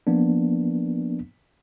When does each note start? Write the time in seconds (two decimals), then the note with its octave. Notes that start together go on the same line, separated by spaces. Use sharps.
0.07 F3 A#3 B3 D4